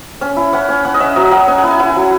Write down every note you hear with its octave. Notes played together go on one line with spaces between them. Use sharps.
C#4
E4
C#4 F#5
C#4
C#4 F#5
D#5
C#4 E5
F#3 D#5
F#3 F#5
C#4 G#5
F#5
E4 G#5
E4 F#5
G#5
F#3 F#5